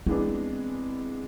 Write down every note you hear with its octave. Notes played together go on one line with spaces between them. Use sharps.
E3 G#3 B3 C4 D4